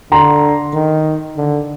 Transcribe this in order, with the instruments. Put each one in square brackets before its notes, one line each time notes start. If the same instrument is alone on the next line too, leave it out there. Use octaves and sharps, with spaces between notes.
[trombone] D3 [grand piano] A#5 C6
[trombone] D#3
D3